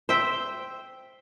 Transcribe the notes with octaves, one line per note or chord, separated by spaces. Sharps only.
C5 E5 G5